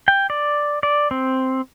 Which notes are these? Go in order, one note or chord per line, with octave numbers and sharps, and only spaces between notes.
G5
D5
D5
C4